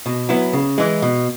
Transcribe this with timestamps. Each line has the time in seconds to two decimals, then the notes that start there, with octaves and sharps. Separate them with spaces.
0.06 B2
0.29 F#3 B3 E4
0.53 C#3
0.78 E3 G#3
1.02 B2